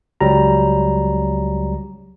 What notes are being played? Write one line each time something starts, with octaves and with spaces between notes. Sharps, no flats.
C#2 F#3 G3 A#5